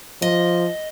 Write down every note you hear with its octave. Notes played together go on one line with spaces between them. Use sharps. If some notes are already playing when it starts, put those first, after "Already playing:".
F3 D#5